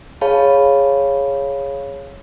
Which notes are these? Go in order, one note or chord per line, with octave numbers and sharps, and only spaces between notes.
G#4 C#5 F5 A5 B5